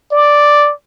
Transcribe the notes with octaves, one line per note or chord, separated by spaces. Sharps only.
D5